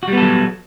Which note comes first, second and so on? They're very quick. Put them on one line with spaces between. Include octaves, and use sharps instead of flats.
F#4 G3 B3 A4 F#3